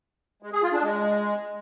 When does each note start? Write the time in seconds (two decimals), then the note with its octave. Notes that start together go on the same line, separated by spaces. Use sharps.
0.42 G#3
0.53 G#4
0.63 F4
0.73 D4
0.83 G#3